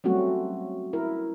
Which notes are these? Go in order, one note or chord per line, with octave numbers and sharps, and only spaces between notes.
F#3 G3 A3 C4 C#4 F#4
E4 A#4